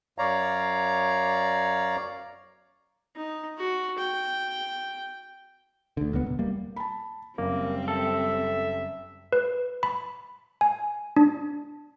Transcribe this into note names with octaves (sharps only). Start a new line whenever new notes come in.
F#2 C#5 D5 F5 A#5
D#4
F#4
G5
D2 D3
D1 C#2 D3 B3
E1
G3 A#3
A5 B5
F#1 G3 A#3 C4
A4 E5
B4
B5
G#5
D4